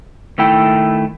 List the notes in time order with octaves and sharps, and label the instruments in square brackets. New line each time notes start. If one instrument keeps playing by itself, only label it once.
[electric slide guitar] D#3 A3 E4 G5